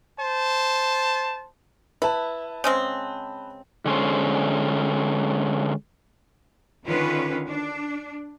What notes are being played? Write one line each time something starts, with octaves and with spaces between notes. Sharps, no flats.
C5 A5
E4 B4 A5
C#3 G#3 C4
D3 G#3 C#4 C5
D3 D#3 C#4 F4 B4
D4